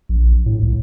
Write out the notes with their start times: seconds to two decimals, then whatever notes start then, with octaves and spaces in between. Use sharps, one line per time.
0.09 A#1
0.46 A2
0.62 C2